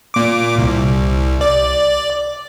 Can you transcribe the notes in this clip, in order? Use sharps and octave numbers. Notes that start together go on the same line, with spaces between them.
A#2 D6
C2
D5